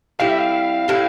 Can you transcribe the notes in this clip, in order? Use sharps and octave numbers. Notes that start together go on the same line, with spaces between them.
A2 G3 C4 E4 F5
E5
F5
A2 G3 C4 E4